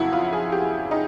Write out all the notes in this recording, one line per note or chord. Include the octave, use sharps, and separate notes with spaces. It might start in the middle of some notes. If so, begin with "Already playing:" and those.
Already playing: F2 C#3 F#3 B3 E4 F#4
F4
G#4
G4
D#4